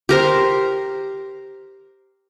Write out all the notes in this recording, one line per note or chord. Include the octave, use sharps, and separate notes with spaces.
G4 A#4 C5